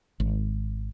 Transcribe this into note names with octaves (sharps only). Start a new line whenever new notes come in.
G#1